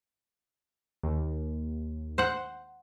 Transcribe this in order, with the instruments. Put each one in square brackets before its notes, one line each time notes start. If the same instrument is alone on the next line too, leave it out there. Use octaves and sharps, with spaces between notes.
[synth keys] D#2
[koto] C5 F#5